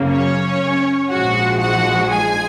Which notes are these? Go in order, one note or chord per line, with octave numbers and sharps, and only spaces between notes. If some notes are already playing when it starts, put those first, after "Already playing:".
Already playing: F#2 C#3 F#3 A#3
C#4 C#5
A#1 G#2 F3 G#3 F#4 F#5
F#4 F#5
G#4 G#5